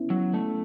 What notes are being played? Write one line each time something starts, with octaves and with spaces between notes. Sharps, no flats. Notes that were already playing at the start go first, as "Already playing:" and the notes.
Already playing: B3 C#4 E4
F#3
A3